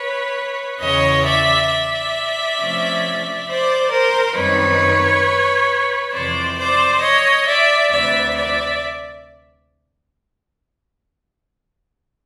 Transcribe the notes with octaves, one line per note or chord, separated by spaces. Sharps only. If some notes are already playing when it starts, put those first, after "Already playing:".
Already playing: B4 C#5
E2 C#3 E3 C#5 D#5
D5 E5
D5 E5
C3 F3 A3 C#4
C5 D5
A#4 C5
F#2 D#3 G3 C4 D#4 B4 C#5
F2 C3 E3 C5 D5
C5 D5
C#5 D#5
D5 E5
D2 C3 E3 D5 E5
D5 E5